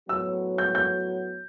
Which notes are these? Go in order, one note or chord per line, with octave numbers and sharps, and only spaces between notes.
A2 F#3 B3 F#4 E6
G6
G6